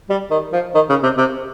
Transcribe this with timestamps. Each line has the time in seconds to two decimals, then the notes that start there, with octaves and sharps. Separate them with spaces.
0.10 G3
0.31 D#3
0.53 F3
0.75 D#3
0.89 C#3
1.03 C3
1.18 C3